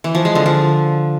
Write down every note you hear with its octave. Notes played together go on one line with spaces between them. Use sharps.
E3
F3
G#3
D3
F3